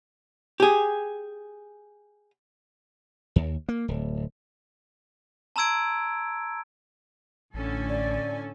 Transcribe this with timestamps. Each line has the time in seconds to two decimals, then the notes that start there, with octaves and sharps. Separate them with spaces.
0.60 G4 G#4
3.36 D#2
3.69 A#3
3.88 D1
5.56 A5 A#5 C6 E6 G#6 D7
7.54 A1 A2 D3 C#4 A4 G#5
7.88 D5